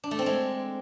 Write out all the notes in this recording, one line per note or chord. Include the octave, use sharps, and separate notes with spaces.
D4
A3
C4
G#3